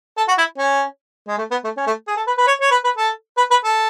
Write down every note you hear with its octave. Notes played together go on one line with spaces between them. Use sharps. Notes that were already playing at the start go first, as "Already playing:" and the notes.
A4
F#4
E4
C#4
G#3
A3
B3
A3
C#4
A3
G#4
A4
B4
B4
C#5
C#5
B4
B4
A4
B4
B4
A4